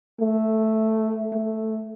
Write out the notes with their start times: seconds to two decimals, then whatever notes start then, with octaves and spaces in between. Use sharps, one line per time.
0.21 A3
1.32 A3